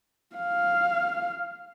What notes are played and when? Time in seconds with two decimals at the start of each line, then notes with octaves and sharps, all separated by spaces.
0.36 F5